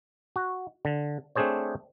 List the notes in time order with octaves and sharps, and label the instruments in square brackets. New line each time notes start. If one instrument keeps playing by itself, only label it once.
[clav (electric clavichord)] F#4
D3
A3 C4 D4 G#4 C5 C#5